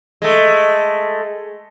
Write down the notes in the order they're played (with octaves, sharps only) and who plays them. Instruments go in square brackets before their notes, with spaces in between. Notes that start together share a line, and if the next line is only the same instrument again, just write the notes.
[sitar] G#3 A3